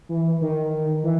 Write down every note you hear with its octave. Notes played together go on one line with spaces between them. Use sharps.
E3
D#3
E3